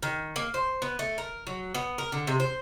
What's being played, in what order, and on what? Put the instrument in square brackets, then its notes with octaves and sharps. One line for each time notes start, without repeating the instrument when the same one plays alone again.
[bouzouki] D#3
A#3
C5
B3
A3
A#4
F#3
B3
A#4
D3
C3
C5